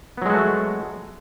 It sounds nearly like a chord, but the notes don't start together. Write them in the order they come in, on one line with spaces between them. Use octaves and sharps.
B3 F#3 G#3 F#4 A3